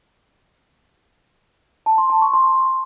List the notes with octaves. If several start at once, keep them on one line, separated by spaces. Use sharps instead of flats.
A5
C6
A5
C#6
C6